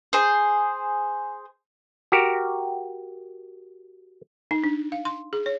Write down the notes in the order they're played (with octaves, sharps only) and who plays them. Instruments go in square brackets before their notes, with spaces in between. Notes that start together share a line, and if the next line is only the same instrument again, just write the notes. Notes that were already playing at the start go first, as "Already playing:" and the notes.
[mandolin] G#4 C5
[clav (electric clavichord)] F#4 G4 A#4
[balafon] D#4
D4
F5
C6
G#4
C#5